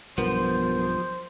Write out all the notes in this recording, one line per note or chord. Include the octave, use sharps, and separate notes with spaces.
B1 G2 F3 B3 A#4 C5